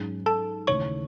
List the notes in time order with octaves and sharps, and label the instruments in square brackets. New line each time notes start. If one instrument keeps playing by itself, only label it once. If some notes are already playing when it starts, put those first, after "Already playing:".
Already playing: [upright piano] G#2 F#3 C#4 G#4
[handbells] A4 A5
[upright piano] D#2 C#3 E3 A3 [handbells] C#5 C#6